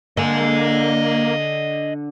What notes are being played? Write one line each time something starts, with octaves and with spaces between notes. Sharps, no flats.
D3 A#3 D#5 G#5